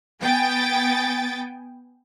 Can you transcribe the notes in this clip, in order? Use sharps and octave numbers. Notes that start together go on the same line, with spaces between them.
B3 G5 G#5 A6